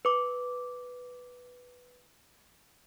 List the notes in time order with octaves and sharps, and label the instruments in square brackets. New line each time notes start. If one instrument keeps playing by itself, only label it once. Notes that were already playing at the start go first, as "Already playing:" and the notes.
[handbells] B4 D6